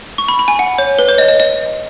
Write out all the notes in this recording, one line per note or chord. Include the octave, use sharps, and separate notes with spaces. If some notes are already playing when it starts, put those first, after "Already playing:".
C#6
B5
B5
G#5
F#5
C#5
B4
C#5
D#5
D#5
D#5